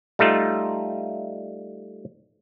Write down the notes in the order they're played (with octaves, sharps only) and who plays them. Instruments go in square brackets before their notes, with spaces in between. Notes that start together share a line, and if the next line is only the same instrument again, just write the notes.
[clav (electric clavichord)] G3 A3 D#4 F4